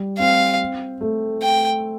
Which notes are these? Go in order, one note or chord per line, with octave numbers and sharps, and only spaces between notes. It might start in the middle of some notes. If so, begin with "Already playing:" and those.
Already playing: G3
C4 F5
A3
G5